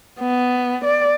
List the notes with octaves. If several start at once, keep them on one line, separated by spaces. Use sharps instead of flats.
B3
D5